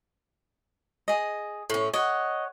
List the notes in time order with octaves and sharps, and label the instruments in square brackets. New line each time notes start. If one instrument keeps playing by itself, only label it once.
[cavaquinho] G#4 D#5
[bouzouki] A2 C#4
[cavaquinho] C#5 F#5 [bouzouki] D#5